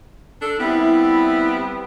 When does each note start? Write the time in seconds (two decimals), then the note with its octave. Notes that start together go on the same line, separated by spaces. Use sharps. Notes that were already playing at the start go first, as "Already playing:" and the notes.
0.42 D4 A4
0.60 G3 B3 C4 E4
0.76 E4